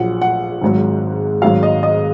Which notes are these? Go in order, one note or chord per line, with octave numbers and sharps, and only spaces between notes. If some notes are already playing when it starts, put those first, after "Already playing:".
Already playing: A#1 A#2 F#3 F#5
F#5
G#1 G#2 F#3
G#1 G#2 F#3 F5
D#5
D#5